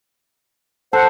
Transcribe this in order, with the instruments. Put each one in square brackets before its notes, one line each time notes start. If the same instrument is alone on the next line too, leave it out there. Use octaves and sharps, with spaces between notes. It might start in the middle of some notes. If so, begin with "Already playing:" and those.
[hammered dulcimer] A4 [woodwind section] C5 F#5